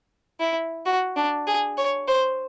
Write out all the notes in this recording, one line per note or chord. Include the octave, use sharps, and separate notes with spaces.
E4
F#4
D4
G#4
C#5
C5